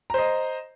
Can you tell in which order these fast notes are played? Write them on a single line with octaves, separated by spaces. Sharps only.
A#5 C5 D#5